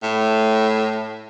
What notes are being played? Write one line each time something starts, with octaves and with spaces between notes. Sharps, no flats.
A2